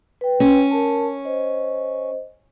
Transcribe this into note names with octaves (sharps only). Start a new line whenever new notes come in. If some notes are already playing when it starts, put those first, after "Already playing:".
B4 G5
C#4
A#4 A5
C5 D#5